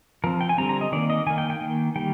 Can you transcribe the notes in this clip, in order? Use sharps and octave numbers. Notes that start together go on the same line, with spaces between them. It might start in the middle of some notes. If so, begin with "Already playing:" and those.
F3 C4 A#4
G5
G#5
D3 G3 C4 A#5
A#5
D#5
D#3 A#3 D5
D#5
D#3 A#3 G#5
G5
G5
D#3 A#3
D#3 G3 A#3 G5